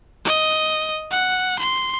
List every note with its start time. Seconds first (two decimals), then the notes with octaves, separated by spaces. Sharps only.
0.25 D#5
1.11 F#5
1.59 C6